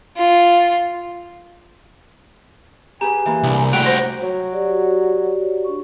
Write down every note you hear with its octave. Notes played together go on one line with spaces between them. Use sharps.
F4
G4 G#4 B4 G#5 A#5
E3 A#3
C2 D4
G3 A3 E4 F#4 G5 F#6 D7 F7
C5 C6 A#6
F#3
F#4 G4 D5
D4 C#6